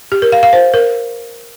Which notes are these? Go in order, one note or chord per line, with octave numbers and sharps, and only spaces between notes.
G4
A#4
F5
F5
C5
A#4